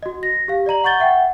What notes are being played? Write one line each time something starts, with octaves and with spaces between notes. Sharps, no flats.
F#4 D#5
A#6
G4 F5
D5 D#5 A#5 F#7
F#5 C#6 G6 A6 G7
E5 F#5 G5